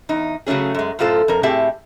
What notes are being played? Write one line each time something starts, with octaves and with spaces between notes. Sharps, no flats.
E2 D#4
C#3 F#3 A3 C#4 G#4
F#2 G#3
F#2 A2 F4 A4 C5
F2 A#4
A2 C4 G4 G#4 E5 A5